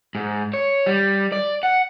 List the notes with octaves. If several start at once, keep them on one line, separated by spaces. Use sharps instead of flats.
G#2
C#5
G3
D5
F#5